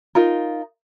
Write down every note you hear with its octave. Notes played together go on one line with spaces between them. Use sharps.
D#4 F4 A#4